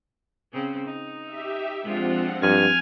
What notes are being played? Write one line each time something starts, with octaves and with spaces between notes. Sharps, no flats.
C#3 C4 C#4
D#4
G4 E5
F3 G#3 C4 D4 F4 F#5
G2 G#5 F6